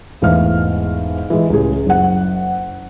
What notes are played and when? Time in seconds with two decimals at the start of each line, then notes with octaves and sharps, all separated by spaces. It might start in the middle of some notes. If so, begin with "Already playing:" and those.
0.22 E1 G#2 E3 A3 F5 F6
1.30 E3 G#3
1.50 C#2 A2 G#4
1.86 F#1 F#5